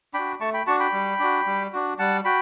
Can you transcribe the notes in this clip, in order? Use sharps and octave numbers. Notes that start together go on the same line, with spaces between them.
D4 F#4 G5 B5
A3 A5 C#6
G5 B5
D4 F#4 A5 C#6
G5 B5
G3
D4 F#4
G3
D4 F#4
G3 F#5 A5
F#4 G5 B5